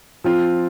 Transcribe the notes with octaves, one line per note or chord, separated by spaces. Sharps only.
F3 C4 F4